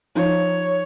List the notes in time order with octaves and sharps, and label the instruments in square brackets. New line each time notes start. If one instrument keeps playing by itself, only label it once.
[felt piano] F3 D#4 [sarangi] C#5